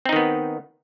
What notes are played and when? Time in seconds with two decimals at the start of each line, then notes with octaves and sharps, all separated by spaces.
0.06 C4
0.09 D#4
0.13 D#3
0.16 B3